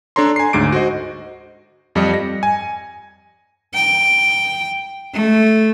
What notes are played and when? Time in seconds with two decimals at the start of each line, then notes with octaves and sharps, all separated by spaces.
0.16 D4 A4 C#5 A#5 C6
0.36 G#5 C7
0.53 D2 G#2 D6 D7
0.72 F#4 C5 D#5
1.95 F2 G3 G4 D#5 C#7
2.14 A#6
2.43 G#5
3.74 G5
5.14 A3